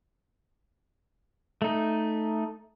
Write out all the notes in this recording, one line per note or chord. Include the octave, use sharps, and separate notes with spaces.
A3 D#4